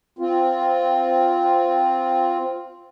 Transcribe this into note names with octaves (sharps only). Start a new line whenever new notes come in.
C4 F4